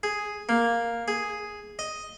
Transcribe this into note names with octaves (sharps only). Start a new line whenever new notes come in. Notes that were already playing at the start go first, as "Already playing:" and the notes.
G#4
A#3
G#4
D#5